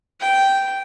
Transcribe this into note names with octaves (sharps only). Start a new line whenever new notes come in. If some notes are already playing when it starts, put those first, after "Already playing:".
G5